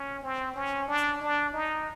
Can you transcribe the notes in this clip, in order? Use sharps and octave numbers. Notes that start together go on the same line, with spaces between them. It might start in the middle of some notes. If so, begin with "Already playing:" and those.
Already playing: C#4
C4
C#4
D4
D4
D#4